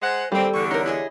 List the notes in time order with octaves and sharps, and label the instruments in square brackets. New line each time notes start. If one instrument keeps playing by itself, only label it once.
[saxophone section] G#3 F#5 [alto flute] C5
[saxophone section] D#3 A#3 C4 [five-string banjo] G3 [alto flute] A4
[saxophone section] E2 D3 [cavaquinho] C#6
[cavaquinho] D#4 A#4 [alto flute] C#5
[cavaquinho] E4 G#4 D#5